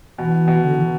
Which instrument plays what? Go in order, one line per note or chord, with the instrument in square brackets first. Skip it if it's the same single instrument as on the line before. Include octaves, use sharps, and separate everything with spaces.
[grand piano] B2 [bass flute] E3
[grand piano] B2
[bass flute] D3
E3